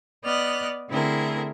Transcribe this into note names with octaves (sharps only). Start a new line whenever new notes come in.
B3 D5 D#5 F6 F#6
D3 A3 C4 E4 G#4 A#4